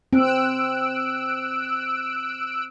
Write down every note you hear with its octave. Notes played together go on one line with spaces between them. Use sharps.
C4 E6 F#6 D7